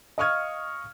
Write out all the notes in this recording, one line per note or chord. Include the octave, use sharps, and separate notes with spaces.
D#5 F5 C#6 D#6 F6 G#6